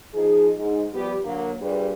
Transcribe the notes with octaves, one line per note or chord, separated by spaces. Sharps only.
F3 D#4 G#4
G#2
F3 G3 B3 G4
D3 F#3 A#3
G2 A#2 G3 G#4 B4